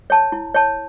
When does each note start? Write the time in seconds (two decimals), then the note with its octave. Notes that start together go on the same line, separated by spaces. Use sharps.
0.10 C#5 A5
0.32 E4
0.54 C#5 A5